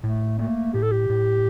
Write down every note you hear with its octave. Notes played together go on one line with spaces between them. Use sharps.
A2 A3
A3 A#3
A2 G4
A4
G4
A2